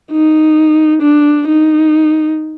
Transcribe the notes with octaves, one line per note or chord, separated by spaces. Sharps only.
D#4
D4
D#4